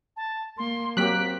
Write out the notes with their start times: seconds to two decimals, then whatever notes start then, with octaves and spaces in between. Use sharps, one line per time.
0.16 A5
0.58 A#3 C6
0.97 F#3 A#3 C4 G4 F#6 B6 D7